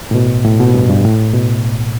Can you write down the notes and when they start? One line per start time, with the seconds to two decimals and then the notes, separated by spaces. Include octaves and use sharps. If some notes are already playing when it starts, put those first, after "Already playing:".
0.11 A2
0.15 B2
0.45 A2
0.60 B2
0.74 G2
0.89 G2
1.05 A2
1.34 B2